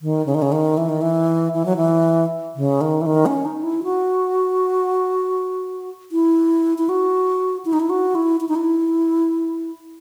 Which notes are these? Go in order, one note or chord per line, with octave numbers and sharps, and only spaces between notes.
D#3
C#3
D#3
C#3
D#3
E3
D#3
E3
E3
F#3
E3
C#3
D#3
E3
D#3
C#4
D#4
E4
F#4
E4
E4
F#4
E4
D#4
E4
F#4
E4
E4
D#4
E4